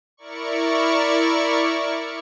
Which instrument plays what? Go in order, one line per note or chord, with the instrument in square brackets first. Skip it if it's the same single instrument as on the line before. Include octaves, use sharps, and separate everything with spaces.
[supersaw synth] E4 A#4 D5 C#6